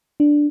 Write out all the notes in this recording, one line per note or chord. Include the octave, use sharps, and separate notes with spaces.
D4